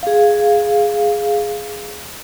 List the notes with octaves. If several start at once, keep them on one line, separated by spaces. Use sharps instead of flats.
G#4 F5